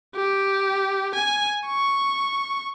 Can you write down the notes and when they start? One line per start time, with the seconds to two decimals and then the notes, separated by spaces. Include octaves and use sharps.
0.16 G4
1.15 G#5
1.67 C#6